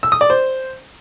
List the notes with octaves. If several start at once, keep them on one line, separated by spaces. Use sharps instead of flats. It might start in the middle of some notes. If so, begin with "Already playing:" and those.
E6
D#6
D5
C5